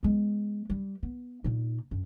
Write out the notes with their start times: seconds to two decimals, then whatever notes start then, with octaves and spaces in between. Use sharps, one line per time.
0.03 G#3 B3
0.70 G3
1.03 B3
1.44 A#2 D#4
1.91 F#2